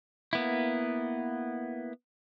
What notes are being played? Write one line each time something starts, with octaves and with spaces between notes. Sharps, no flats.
A#3 B3 E4